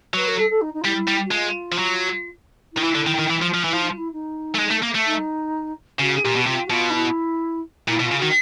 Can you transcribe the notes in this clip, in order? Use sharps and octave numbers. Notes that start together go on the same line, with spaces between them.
F#3 B4
A#4
A4
A4
D#4
D#4
F4
G3 E4
G3
F#4
G#3 F4
F3
F#3
E4
D#3
E3
D3
D#3
D#3
E3
F3
F3
E3 E4
F3
D#4
F4
E4
D#4
A3
G#3
A3
A#3
A3
D#4
C#3 F#4
G#4
A#2 G4
B2
C3 F4
F#4
B2 F4
D#4
E4
A#2 E4
B2
F4
C#3
D#3 F#4